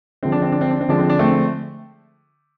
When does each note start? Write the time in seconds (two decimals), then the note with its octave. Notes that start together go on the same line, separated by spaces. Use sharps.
0.23 D3 F3 G#3 C4
0.32 D4
0.42 C4
0.52 D4
0.61 C4
0.71 D4
0.81 C4
0.89 D3 F3 G#3 D4
0.99 C4
1.10 D4
1.19 A3 C4